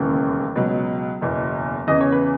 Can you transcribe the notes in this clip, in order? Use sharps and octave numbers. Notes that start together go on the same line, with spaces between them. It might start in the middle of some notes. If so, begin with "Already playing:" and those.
Already playing: E1 D#2 C#3 E3
C#2 B2 F#3
F#1 E2 B2
E2 C#3 E3 D#5
C#5
B4